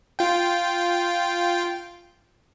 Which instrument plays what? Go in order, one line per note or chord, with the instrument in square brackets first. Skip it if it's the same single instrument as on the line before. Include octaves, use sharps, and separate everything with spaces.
[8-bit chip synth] F4 G5